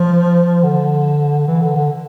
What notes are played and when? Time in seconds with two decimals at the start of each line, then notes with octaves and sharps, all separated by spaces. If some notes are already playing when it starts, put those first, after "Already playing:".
Already playing: F3
0.63 D3
1.48 E3
1.62 D3
1.76 D3